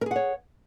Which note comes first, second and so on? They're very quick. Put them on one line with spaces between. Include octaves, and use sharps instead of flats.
A#4 G#4 F#5 C#5